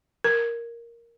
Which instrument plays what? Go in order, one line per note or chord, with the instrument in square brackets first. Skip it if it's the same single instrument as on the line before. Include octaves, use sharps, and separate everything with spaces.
[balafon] A#4